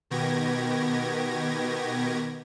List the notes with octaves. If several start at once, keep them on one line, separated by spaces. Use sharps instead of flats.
B2 D#3 B3 G4 G#6 A#6